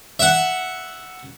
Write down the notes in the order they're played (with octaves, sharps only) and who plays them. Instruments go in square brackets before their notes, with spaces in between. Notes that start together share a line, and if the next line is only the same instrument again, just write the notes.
[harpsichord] E5 F#5